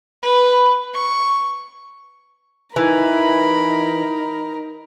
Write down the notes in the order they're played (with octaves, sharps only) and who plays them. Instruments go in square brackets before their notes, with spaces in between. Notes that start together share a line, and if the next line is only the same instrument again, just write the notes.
[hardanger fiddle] B4
C#6
[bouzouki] E3 [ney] D#4 [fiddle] A#4 [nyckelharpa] B5